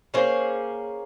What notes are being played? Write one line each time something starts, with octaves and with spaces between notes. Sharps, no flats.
A#3 C#4 G#4 C5